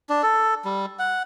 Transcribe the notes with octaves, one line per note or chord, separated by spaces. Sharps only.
D4
A4
G3
F#5